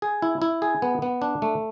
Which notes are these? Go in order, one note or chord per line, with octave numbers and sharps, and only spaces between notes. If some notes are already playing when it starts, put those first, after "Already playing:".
G#4
E4
E4
G#4
B3
B3
D4
A3